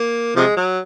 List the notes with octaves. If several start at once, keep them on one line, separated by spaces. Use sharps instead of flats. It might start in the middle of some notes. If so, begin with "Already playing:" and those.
Already playing: A#3
C3 F3 G#3
F#3